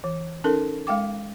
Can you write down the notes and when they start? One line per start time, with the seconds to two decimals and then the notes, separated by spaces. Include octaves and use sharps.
0.04 E3
0.44 C#4 D#4 A4 A#4
0.87 G#3 F5 G5 D6